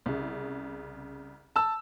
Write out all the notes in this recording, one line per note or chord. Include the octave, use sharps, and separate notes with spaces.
C2 C#3
A5 E6